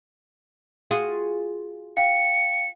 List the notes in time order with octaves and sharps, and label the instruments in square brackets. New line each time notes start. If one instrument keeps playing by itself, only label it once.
[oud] F4 F#4 G#4
[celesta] F5 G5 [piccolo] C#7